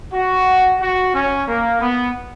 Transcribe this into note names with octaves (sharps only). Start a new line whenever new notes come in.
F#4
F#4
C#4
A#3
B3